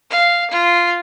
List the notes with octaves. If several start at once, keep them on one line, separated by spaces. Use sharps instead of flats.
F5
F4